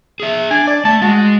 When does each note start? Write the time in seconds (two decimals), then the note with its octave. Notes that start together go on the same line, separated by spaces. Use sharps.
0.20 G#4 E5
0.51 D4 G#5
0.68 D5
0.85 A3 A5
1.02 G#3 F#4